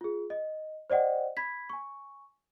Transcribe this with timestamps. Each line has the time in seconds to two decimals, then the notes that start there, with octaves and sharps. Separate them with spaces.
0.01 F4 G#4
0.30 D#5
0.90 C5 D5 D#5 F#5 G5
1.37 B5 G#6 B6
1.70 G#5 C#6